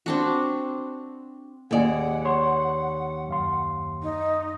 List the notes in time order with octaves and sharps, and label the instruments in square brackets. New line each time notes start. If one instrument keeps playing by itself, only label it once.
[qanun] C4 D4 F#4
[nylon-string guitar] D#2 D5 [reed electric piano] G#4 D#5 G#5 [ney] F#5
[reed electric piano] C#5 C6 C#6
F#2 F5 C6
[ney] D#4